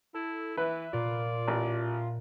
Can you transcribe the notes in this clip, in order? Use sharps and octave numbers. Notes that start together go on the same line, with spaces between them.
E4 A4
E3 B4 E5
A#2 F4 D5
A1